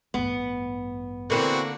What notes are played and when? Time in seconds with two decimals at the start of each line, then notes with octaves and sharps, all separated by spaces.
0.14 A1 G2 B3
1.30 D3 E3 A#3 C4 F#4